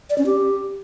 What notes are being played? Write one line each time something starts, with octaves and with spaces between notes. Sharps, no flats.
D5
C#4
G4